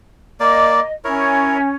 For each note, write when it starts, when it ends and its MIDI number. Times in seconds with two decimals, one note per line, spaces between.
0.40 0.80 58
0.40 0.80 74
0.40 0.92 75
1.05 1.75 61
1.05 1.58 64
1.05 1.58 70
1.05 1.58 73